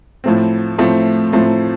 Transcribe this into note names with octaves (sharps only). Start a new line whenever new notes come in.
A2 F3 A3 C4
A2 F3 A3 C4
A2 F3 A3 C4